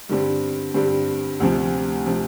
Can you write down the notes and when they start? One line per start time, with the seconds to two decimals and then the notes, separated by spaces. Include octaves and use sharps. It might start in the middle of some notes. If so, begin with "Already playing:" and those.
0.09 G2 D3 G3 C4
0.74 G2 D3 G3 C4
1.40 D2 C3 F3 C4
2.06 C3 F3 C4